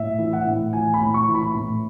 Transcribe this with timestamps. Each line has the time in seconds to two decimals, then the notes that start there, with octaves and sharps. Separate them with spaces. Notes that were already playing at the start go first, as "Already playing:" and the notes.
Already playing: A2 E5
0.19 E3
0.33 F#5
0.47 A2
0.73 E3 G#5
0.94 B5
1.01 A2
1.14 C#6
1.28 E3
1.35 B5
1.55 A2